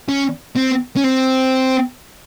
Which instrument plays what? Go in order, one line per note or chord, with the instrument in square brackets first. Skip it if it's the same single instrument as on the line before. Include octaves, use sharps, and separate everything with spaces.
[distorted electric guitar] C#4
C4
C#4
C4